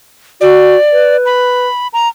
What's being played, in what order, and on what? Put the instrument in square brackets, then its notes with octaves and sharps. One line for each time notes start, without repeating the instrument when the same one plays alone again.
[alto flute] F#4 [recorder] D5
[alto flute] B4
[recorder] B5
A#5